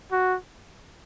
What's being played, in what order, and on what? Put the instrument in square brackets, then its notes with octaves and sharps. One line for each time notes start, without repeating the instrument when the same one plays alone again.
[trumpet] F#4